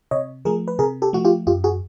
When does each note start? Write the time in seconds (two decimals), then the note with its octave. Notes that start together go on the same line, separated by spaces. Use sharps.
0.11 C3 C#5 D#5
0.45 F3 A3 G#4 A#4
0.68 B4
0.79 C3 G#4 A#4
1.02 G4 A4
1.13 F3 A3 F#4
1.25 F4 G4
1.47 F#2 F4 G4
1.64 F#4 G#4